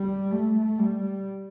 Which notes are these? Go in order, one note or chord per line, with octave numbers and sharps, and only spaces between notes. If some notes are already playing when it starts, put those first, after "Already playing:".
Already playing: G3
A3
G3